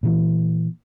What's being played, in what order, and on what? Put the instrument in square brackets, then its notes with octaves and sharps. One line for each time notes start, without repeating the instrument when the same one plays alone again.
[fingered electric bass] A#2 E3